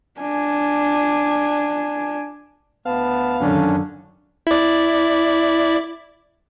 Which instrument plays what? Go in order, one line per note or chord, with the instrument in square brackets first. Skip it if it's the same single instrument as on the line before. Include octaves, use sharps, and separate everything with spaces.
[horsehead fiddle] D4 G#5
[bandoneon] D2 A5 [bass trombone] B3 [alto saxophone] F5
[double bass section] F#2 D3 D#3 [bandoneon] C#4 D4
[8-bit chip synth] E4 D5